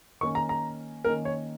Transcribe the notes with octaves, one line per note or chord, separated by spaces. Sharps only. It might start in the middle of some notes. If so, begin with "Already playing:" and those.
D#3 A#3 C#4 C#6
A#5
A#5
D#3 A#3 C#4 A#4
C#5